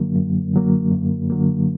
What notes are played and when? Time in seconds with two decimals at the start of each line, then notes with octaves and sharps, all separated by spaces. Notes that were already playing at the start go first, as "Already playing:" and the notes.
Already playing: F#2 D3 F#3 A#3
0.15 F#2
0.53 D3 F#3 A#3
0.92 F#2
1.30 D3 F#3 A#3